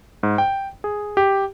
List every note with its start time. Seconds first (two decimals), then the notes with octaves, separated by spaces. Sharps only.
0.23 G#2
0.38 G5
0.84 G#4
1.17 G4